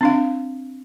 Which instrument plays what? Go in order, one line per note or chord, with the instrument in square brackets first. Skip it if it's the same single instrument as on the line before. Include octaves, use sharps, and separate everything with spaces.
[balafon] C4 D4 F5